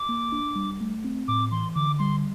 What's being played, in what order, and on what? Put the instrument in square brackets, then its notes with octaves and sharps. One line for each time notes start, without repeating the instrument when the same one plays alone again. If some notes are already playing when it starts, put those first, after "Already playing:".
Already playing: [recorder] D6
[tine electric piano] A#3
D4
G3
A3
C4
[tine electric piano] A2 [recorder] D6
[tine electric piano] E3 [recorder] C6
[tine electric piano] D3 [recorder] D6
[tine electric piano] G3 [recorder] C6